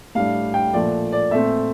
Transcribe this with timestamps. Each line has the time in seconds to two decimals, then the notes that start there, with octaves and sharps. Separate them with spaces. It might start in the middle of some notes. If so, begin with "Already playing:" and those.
0.15 A2 G3 D4 F5
0.54 G5
0.73 A#2 F3 A3 D5
1.12 D5
1.31 A#2 A3 C4 E5